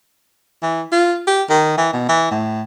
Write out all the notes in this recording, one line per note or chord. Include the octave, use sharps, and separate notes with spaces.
E3
F4
G4
D#3
E3
B2
E3
A2